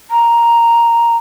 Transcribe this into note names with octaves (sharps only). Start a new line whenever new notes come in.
A#5